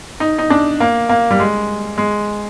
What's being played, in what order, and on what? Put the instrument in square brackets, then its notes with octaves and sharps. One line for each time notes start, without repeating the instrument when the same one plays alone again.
[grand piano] D#4
D#4
D4
A#3
A#3
G3
G#3
G#3